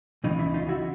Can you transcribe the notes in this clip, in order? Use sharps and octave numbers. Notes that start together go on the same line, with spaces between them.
C#2 C#3 E3 D#4
E4
D#4 F4
E4 F#4